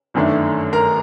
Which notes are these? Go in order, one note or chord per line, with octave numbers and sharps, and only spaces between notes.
G1 F#2 D#3 A3 D4
A#4 A#5